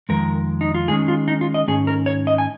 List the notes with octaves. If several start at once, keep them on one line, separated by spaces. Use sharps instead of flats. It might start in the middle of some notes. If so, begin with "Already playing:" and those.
F2 D#3 G#3 A#4
D#4
F4
D#3 G#3 C#4 G#4
F4
D#4
F4
D#5
G#2 D#3 C#4 G#4
A#4
C#5
D#5
G#5